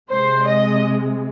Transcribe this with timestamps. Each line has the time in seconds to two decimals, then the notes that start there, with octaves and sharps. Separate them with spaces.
0.10 C3 G#3 C5
0.47 D#5